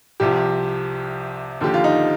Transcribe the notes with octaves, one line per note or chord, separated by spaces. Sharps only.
C2 C3 F3 G4
D#2 D3 F3 G4
F4
D#4